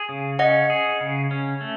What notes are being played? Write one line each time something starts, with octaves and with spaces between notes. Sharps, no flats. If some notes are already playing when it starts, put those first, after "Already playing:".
Already playing: G#4
C#3
C#4 D#5 F#5
G#4
C#3
C#4
A3